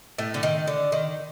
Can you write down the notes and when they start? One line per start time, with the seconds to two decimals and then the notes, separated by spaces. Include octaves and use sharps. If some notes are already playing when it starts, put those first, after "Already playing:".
0.18 A2 A3
0.34 D3
0.43 D#3
0.67 D3
0.92 D#3